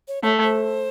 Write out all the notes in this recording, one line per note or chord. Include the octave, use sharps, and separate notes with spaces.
C#5
A3 C#5
C5